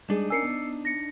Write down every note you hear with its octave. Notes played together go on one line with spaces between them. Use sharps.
G3 G#3 D4 D#4 G#4
C#4 A#4 G#5 E6 C7 C#7
B3
A#6 C#7